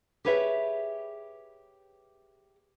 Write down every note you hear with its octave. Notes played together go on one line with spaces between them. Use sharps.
G4 G#4 B4 C#5 E5